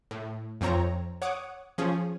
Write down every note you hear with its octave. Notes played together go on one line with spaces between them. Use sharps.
A2
F2 F3 C4 C#5 A#5
C#5 F#5 D6 D#6 G#6
F3 C#4 G#4